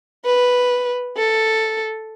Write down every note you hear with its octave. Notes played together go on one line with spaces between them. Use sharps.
B4
A4